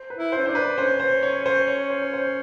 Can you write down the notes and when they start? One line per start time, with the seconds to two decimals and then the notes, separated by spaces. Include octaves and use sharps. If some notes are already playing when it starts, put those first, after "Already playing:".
Already playing: C5
0.10 B4
0.17 E4
0.32 C5
0.38 C#4
0.46 D4 C5
0.55 B4
0.78 C#4 C5
1.00 C5
1.23 C#5
1.46 C5
1.68 C#5
1.90 C5
2.02 C#5
2.13 C5